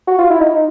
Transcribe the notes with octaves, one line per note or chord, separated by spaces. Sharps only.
F#4
F4
E4
D#4